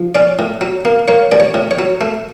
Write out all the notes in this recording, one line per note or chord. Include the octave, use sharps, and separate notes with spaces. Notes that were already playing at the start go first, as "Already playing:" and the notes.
Already playing: F3
C#4 D5
A2
F#3
A#3
A#3 C#5
A1 D5
C#5
A2
C#5
F#3
A3